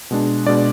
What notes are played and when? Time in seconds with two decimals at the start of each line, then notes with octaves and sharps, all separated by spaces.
0.11 B2 G#3 D4
0.46 B2 G#3 D4 D5